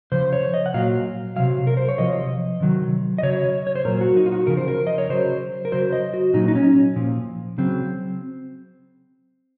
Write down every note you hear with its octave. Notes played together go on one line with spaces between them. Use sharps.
C#3 F3 C5
C#5
D#5
F#5
A#2 F#3 F5
C3 D#3 F#3 F5
A#4
C5
C#5
C3 F3 D#5
C3 D#3 F#3
D#5
C#3 F#3 C#5
C#5
C5
A#2 F#3 A#4
F#4
D#4
F4
F#4
C#3 F3 A#4
C5
A#4
D#5
C#5
C#3 F#3 C5
A#4
C#3 F#3 C5
D#5
F#4
A#2 F#3 D#4
D#4
C#4
A#2 F3
C#3 F#3 C4